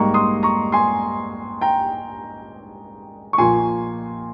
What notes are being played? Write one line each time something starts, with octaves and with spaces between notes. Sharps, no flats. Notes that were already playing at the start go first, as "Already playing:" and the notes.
Already playing: G#2 G3 A#3 A#5 C#6
C6 D#6
A#5 C#6
G#5 C6
G5 A#5
C#6
A#2 F3 A#3 G#5 C6